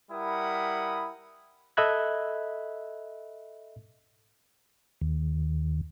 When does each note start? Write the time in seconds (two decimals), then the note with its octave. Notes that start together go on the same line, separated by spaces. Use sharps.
0.11 G3 E4 A#4 F#5 B5 D#6
1.77 A4 D#5 E5 B5 F#6 G#6
5.01 D#2